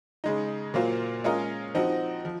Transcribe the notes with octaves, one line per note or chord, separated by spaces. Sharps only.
C#3 G#3 D#4
A#2 F#3 A#3 F4 C5
G#3 C#4 F4 A#4 D#5
F3 C4 D#4 F#4
F3